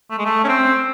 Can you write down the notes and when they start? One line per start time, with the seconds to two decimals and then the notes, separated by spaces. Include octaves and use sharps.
0.10 A3
0.18 G#3
0.25 A3
0.44 C#4
0.48 C4